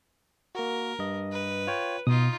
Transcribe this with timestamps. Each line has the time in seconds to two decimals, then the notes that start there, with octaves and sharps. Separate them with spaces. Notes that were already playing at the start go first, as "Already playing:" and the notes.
0.55 A#3 F#4 A#4
0.99 G2 D#5
1.32 B4
1.67 F4 C#5 G5
2.07 B2 D#4 F4 D#6